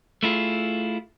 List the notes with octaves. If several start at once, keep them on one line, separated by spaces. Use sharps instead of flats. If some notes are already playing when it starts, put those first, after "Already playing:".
A3 E4 F4 G#4